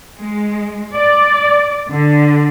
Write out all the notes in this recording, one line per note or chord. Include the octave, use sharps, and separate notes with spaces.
G#3
D5
D3